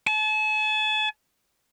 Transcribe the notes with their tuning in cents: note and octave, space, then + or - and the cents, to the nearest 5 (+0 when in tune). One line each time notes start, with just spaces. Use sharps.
A5 -40